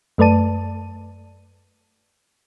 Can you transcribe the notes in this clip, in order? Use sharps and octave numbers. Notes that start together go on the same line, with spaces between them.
F#2 A3 B4 D5 A5 D#7